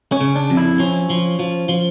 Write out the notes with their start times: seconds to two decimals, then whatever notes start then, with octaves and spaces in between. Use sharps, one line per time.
0.12 C#4
0.21 C#3
0.36 D4
0.50 F2
0.57 E4
0.79 F3 C#4
1.10 F3
1.39 F3
1.69 F3